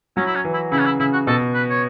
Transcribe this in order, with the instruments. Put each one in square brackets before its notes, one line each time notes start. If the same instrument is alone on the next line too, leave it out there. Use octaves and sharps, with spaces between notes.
[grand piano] F#3 [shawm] C#4
[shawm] E4
C#4
[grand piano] E3
[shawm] E4
[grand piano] C#3 [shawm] E4
[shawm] C#4
E4
[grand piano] C#3 [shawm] E4
[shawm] F#4
[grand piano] B2 [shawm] A4
[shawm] B4
C#5